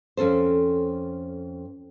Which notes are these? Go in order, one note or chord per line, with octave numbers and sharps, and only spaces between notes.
F2 C#4 A4 C5